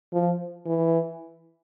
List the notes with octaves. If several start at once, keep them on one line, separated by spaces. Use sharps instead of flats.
F3
E3